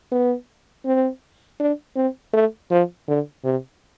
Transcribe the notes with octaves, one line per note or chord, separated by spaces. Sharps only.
B3
C4
D4
C4
A3
F3
D3
C3